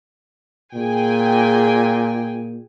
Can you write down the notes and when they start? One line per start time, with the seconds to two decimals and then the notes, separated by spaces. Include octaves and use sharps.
0.74 A#2 G#4 G5 G#5